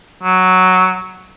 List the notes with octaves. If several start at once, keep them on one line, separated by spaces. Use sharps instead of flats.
F#3